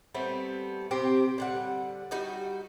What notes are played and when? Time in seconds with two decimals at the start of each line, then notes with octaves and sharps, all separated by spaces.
0.14 G3 A3 B3 C4
0.91 C3 C4 G4
1.38 D3 G3 F#5
2.11 G3 D#4 F#4